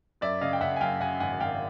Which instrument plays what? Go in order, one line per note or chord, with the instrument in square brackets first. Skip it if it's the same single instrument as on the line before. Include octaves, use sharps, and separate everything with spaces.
[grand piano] F#2 D5 E5
C#3 D#5 F5
G5
C#3 E5 F#5
G#5
F#2 F5 G5
C#3 F#5 G#5
G#1 F#5 G#5
G#1 F5 G5